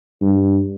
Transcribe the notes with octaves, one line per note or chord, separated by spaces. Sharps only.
G2